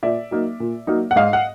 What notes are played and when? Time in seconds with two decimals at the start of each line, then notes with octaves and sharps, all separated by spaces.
0.03 A#2 D5 E5
0.31 F#3 A#3 D#4
0.60 A#2
0.87 F#3 A#3 D#4
1.11 F#5
1.16 G#2 D#5 F5
1.33 F#5